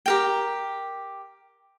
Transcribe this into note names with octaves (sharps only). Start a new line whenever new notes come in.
G4 A#4 G5